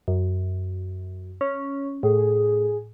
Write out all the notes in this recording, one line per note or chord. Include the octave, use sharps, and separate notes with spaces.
F#2
C#4
A2 G#4